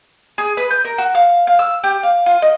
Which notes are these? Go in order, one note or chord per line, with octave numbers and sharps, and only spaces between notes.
G#4
B4
G6
A#4
F#4
F5
F5
E6
G4
F5
F4
D#5